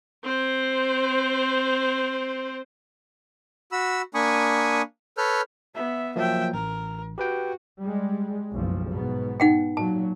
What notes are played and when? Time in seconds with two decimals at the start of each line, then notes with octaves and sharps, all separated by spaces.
0.24 C4 C5
3.72 F#4 B5 E6
4.15 A#3 D4 G#5 B5 C#6 D#6
5.18 A4 B4 C#5 F6 G6
5.75 B3 E5
6.16 F3 F#3 A#3 E5 G5
6.54 A1 A#4
7.18 F#4 G4 B4 G5
7.80 G3 G#3
8.53 F#1 B1 F3
8.92 G#2 B2 B3
9.40 D#4 F#5 G5
9.77 A#2 F#3 A5